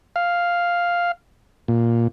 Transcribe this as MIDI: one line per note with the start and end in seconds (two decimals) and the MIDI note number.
0.16 1.12 77
1.68 2.08 46